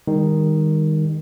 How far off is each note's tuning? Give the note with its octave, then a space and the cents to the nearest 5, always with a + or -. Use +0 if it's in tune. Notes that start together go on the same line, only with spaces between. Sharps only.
D#3 +0 G3 +45 D#4 +0